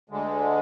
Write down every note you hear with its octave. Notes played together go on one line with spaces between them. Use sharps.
D2 D3 G#3